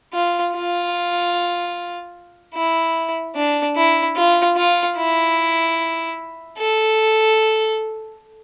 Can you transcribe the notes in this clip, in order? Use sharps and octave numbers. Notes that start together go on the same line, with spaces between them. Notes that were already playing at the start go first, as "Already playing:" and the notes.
F4
F4
E4
D4
E4
F4
F4
E4
A4